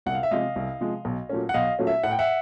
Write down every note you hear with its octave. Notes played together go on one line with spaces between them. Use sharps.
C2 F#5
F5
E5
C3 F3 G#3 D#5 F5
C2
C3 F3 G#3
B1
A#2 F#3 A3 C#4
F#5
B1 D#5 F5
A#2 F#3 A3 C#4
E5
A2 F#5
G5
E5 F#5